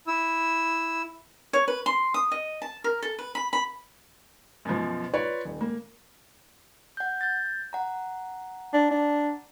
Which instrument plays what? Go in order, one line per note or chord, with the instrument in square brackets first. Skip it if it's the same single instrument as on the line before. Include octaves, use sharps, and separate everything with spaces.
[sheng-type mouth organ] E4 E6
[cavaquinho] C#5
B4
C6
D#6
D#5
A5
A#4
A4
B4
B5
B5
[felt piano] F#2 B2 F3
F4 B4 C#5 D5
D#1
A#3
[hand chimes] F#5 G6
G6 A6
F#5 A#5
[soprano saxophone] D4
D4